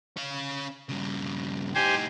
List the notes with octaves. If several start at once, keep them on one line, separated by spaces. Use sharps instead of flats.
C#4 F5
G2 C#3
A2 D#4 G4 C5 G#5